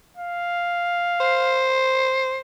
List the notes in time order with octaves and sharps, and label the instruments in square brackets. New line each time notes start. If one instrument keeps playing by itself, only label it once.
[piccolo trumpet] F5
[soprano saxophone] C5